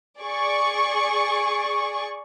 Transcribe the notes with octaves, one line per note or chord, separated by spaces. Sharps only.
G#4 D5 C#6